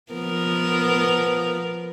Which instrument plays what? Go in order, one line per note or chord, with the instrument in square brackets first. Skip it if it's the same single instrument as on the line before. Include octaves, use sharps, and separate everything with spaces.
[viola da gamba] F3 B3 A#4